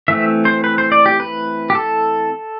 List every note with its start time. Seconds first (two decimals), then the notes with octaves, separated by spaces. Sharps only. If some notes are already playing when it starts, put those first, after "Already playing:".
0.08 E3 A3 C4 E5
0.45 C5
0.64 B4
0.78 C5
0.92 D5
1.06 G4
1.20 B4
1.70 G4
1.75 A4